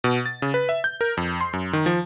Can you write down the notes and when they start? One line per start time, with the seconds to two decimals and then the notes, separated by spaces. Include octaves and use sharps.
0.04 B2
0.26 A6
0.42 C#3
0.54 B4
0.69 E5
0.84 G6
1.01 A#4
1.17 F2
1.41 C6
1.53 F#2
1.73 D#3
1.86 F3